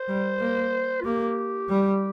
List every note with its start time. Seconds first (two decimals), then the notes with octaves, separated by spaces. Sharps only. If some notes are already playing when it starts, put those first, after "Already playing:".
Already playing: C5
0.08 G3
0.40 A#3
1.01 F4
1.04 A#3 G4
1.69 G3